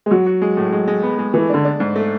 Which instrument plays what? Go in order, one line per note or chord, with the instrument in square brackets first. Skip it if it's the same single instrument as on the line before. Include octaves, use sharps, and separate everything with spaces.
[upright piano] G#3
[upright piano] F#3 [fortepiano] F#4
[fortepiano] F#4
G#3
A2
G#3
G#3
B3
G#3
[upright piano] E3 [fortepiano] A3
[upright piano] D3 [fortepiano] D4
[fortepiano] D4
G#2
A3